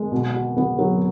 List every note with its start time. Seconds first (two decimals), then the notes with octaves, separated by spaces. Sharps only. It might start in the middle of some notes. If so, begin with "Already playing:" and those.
Already playing: G#3
0.12 B2
0.34 F#4
0.57 B3
0.79 F#3